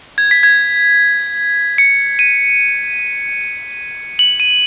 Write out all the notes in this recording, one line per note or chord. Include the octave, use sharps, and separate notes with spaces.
G#6
B6
G#6
C#7
D#7
F#7
D#7